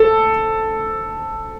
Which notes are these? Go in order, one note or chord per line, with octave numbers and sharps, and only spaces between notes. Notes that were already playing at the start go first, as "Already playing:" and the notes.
Already playing: A4